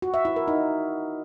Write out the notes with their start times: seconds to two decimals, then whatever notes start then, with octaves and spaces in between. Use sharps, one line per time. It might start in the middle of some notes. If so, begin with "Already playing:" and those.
0.02 F#4
0.14 E5
0.25 E4
0.36 A#4
0.48 D#4